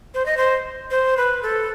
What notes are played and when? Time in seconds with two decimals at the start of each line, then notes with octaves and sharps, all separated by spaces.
0.14 C5
0.26 D#5
0.37 C5
0.91 C5
1.17 B4
1.43 A4